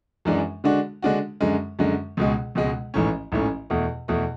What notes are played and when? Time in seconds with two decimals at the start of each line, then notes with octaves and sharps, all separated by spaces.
0.25 F#2 E3 G#3 D4
0.64 D3 G#3 D4 F#4
1.03 D3 G#3 D4 F#4
1.41 F#2 D3 G#3
1.79 F#2 D3 G#3
2.17 C#2 B2 G#3
2.55 C#2 B2 G#3
2.94 A1 G#2 E3 A3 C#4
3.32 A1 G#2 E3 A3 C#4
3.70 E2 B2 A3
4.08 E2 B2 A3